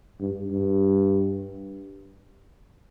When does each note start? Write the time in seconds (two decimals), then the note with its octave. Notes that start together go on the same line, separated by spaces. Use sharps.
0.20 G2
0.51 G2